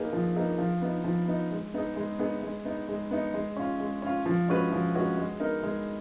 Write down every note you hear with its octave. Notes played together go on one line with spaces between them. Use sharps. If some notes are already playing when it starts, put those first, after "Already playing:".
Already playing: A#3 D#4 G#4 B4
F3
A#3 D#4 G#4 B4
F3
B3 D#4
F3
B3 D#4
G#3
B3 D#4 G#4
G#3
B3 D#4 G#4
G#3
B3 D#4
G#3
B3 D#4
G#3
C#4 F4
G#3
C#4 F4
F3
G#3 C#4 F#4 B4
F3
G#3 C#4 F#4 B4
G#3
B3 D#4 A#4
G#3